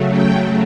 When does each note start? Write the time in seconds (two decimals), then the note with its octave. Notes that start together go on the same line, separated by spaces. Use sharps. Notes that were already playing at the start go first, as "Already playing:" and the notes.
Already playing: C#3 F#3 A3
0.11 G5